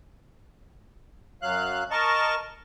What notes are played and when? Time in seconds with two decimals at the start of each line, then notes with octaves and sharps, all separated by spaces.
1.42 F#2 F#3 F5 F#6
1.91 A#4 D#5 A5 C#6